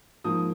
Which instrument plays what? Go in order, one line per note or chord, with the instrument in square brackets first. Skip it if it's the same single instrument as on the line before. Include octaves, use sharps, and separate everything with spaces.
[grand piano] G#2 F3 A#3 D#6